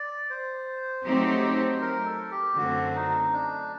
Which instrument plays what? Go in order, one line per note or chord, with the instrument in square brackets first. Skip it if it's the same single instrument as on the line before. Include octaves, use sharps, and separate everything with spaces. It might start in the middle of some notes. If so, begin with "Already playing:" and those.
Already playing: [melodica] D5
C5
[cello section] F#3 A3 C4 D#4 G4
[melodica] A#4
A4
G4
[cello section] F#2 D3 A3 C4 [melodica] F#4
[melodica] D#4
D4